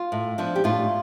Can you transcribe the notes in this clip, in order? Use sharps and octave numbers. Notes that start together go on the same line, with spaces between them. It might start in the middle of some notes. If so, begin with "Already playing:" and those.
Already playing: F4
A2
F3 B3 D4
G4
A2 D4 F4